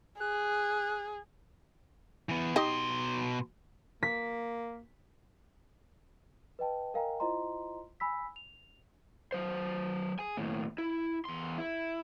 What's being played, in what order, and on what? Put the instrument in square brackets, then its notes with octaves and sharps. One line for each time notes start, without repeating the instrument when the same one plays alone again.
[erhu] G#4 [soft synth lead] F#6
[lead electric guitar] E3 B3
[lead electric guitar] B2 C6 [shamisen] D#4 G4 D#5
[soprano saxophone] A#3 [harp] B6
[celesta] B4 D#5 G5 A5
A#4 D#5 F5 G5 G#5 A#5
E4 F4 C5 D#5 A#5 C6
G#5 B5 E6 B6
F7
[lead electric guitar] F#3 C5
G#4 G#5
D#2 A2
E4
E2 C6
E4